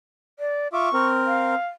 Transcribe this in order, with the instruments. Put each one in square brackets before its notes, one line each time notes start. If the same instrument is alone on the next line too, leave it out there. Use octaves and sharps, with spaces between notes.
[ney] D5
[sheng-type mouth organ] F4 E5 D6 [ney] C#6
[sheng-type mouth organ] C4 A#4
[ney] F5